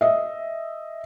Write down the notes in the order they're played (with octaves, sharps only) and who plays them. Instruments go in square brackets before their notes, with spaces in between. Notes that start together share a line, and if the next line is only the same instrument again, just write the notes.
[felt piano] D#5 E5